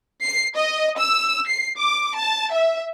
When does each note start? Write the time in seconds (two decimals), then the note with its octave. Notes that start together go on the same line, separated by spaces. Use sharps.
0.23 C7
0.56 D#5
1.00 E6
1.48 C7
1.78 D6
2.15 A5
2.52 E5